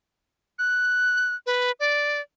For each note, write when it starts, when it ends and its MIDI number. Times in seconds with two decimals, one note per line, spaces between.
0.59 1.35 90
1.46 1.71 71
1.80 2.21 74